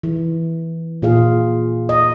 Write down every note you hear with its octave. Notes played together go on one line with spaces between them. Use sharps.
E3
A#2 F4 G#4 F5
D#5